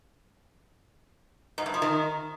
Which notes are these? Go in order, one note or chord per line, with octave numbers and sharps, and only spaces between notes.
G#2
G2
F3
D#3